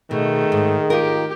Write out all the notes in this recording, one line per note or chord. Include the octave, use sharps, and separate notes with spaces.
B2 D#3 A3 G#4
G#2
F4 G4 A#4